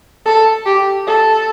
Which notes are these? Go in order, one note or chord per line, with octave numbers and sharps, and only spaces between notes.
A4
G4
A4